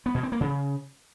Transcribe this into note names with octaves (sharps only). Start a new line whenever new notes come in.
B3
B2
C4
A#3
C#3